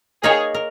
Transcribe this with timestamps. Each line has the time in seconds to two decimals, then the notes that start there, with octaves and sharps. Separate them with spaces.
0.23 A#3 D#4 G#4 A#4 C#5
0.54 A#4